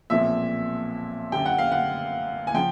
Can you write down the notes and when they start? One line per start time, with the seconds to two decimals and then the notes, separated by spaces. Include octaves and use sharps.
0.10 B1 A#2 F3 G#3 C4 E5
1.32 F#2 D3 G3 G5
1.46 F#5
1.58 F5
1.72 F#5
2.47 G#5
2.54 C#3 F3 G5